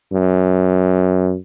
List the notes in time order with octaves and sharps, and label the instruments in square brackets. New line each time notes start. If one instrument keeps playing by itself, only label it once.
[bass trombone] F#2